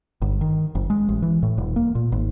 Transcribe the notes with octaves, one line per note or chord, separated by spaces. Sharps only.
G1
D#3
F#1
G#3
A1
E3
A2
D#1
A#3
A#2
G#1